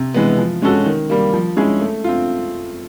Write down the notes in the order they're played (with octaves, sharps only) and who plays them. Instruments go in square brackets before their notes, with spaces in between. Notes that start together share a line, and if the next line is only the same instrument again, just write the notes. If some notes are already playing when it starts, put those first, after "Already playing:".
Already playing: [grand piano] C3
E3 G#3 B3
F3
G#3 C#4 F#4 A4
D#3
G3 A#3
F3
G#3 C#4 E4 G#4
A3
C4 F4